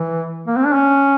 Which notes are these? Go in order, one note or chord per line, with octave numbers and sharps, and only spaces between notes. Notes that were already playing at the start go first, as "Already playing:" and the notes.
Already playing: E3
A#3
C4
D4
C#4